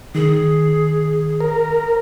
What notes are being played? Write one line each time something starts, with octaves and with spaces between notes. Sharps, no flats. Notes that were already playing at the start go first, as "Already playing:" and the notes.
D#3 G#4
A#4